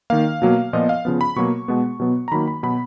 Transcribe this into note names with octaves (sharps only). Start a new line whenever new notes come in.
D#3 A#3 F5
B2 F#3 A#3
A#2 F3 B3 D#5
F5
C#3 F3 B3
B5
B2 F#3 A#3 C#6
B2 G#3 B3
B2 F#3 B3
A#5
D#3 F#3 A#3 B5
B5
B2 F#3 B3 B5